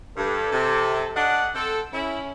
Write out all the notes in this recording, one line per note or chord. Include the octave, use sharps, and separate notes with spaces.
G2 A4
C3
D4 D#5 F#5
C4 A4
C#4 E4